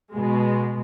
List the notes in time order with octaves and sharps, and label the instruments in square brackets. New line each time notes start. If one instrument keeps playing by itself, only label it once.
[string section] B2 G#3